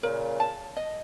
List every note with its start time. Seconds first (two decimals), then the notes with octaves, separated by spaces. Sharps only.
0.03 A#2 C#3 A#4
0.40 A5
0.77 D#5